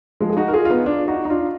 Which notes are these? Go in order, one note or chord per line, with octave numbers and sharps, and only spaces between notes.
F3 G#3
G#4
D#4 F#4
A#4
F4 G#4
F4
B3 D#4
D4 F4
D#4 F#4
D#4
D4 F4